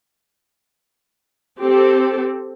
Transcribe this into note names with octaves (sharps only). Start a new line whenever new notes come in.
C4 G4 A4